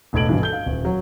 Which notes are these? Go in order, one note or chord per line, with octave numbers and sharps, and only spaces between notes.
E1 A2 D#5 G#6 D7 F#7
G#1 G2 B2 E3
A4 G6 G7
F5
D#1
F#3